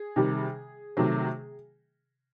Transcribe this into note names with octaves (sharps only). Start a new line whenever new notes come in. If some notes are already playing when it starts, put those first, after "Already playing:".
Already playing: G#4
C3 D#3 G3
C3 D#3 F#3 A3